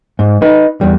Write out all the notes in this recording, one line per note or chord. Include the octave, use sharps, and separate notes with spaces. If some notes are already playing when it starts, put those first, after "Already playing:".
G#2
D#4 B4
E2 G3